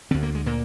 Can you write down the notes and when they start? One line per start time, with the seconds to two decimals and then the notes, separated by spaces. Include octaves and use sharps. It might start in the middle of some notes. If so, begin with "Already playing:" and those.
0.11 D2 D3 C4
0.23 A#3
0.35 G#3
0.46 A#2 A#3